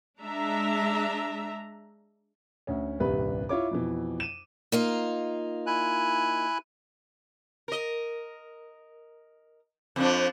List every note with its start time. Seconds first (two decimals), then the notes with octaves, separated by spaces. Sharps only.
0.20 G#3 D4 E5 A#5
2.67 D2 C#4
3.00 D#1 C2 G2 B4
3.49 E4 F4 C#5 D6
3.71 F2 B2 E3
4.20 D#7 E7
4.72 A#3 D#4 F4
5.67 E4 G#5 F#6
7.68 A#4 D#5
9.96 F2 F3 D4